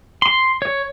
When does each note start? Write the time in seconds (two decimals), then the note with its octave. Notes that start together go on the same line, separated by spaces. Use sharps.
0.22 C6
0.62 C#5